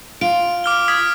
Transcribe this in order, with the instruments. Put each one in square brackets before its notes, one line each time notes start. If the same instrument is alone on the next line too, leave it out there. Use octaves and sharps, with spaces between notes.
[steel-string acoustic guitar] F4 [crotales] D7
[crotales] D6 F6 G7
D#6 G#6 B6